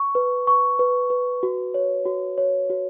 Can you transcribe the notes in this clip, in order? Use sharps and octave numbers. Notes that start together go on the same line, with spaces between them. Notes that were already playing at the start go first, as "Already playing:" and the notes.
Already playing: C#6
B4
C#6
B4
B4
F#4
C#5
F#4
C#5
F#4